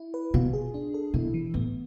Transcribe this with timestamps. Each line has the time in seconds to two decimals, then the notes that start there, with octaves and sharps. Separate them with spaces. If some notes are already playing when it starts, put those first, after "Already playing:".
Already playing: E4
0.14 B4
0.34 B2 F4
0.53 G#4
0.74 D4
0.94 A4
1.14 B2 E4
1.34 E3
1.54 A2 B3